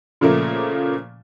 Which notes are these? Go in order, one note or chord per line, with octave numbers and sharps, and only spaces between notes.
A#2 C#3 F3 A3 A#3